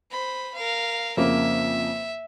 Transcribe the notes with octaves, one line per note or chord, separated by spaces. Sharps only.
C5 B5
A#4 F5
F2 C#3 A#3 E5